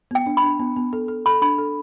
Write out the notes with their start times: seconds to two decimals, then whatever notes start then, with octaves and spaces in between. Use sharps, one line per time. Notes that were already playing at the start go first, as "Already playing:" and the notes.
0.11 B3 G5
0.26 D4
0.37 B5
0.43 D4
0.60 B3
0.76 B3
0.93 A4
1.08 A4
1.26 A4 B5
1.42 D4 B5
1.58 A4